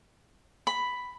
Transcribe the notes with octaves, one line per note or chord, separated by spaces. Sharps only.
B5